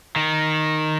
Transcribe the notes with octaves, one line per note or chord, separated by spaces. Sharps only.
D#3 D#4